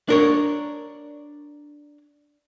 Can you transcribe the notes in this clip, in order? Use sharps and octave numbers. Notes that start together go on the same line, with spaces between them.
D4 A#4 C#5